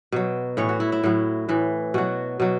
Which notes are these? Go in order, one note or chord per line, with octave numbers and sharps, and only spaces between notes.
B2 F#3
A2 E3 C#5
F#4
E4
E4
A2 F#3
A2 E3
B2 F#3 F#4
B2 F#3